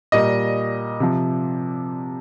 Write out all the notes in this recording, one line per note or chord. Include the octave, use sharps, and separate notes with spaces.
A#2 G3 D#5
C3 F3